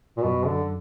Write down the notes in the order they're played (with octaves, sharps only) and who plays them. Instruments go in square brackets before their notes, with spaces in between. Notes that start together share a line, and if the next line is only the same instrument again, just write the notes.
[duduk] A#2
[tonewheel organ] F#2 [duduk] B2
[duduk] D3